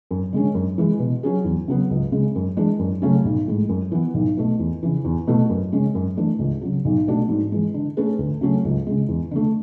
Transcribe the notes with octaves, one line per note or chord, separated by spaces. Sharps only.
F#2
D3 G#3 C#4
F#2
E3 G#3
B2
F#3 C#4 G#4
E2
C#3 F#3 B3
C#2
C#3 G#3
F#2
E3 G#3 D4
F#2
C#3 F#3 A3 C#4
B1
A2 G#3
F#2
E3 B3
B1
B2 A3
E2
C#3 E3
E2
B2 A3 E4
F#2
C#3 G#3 C#4
F#2
E3 A3 D4
C#2
C#3 F#3
B1
B2 A3 D4 F#4
G#2
E3 G#3
D3
A3 C#4 G#4 B4
D2
C#3 F#3 A3 C#4
C#2
C#3 G#3
E2
D3 A3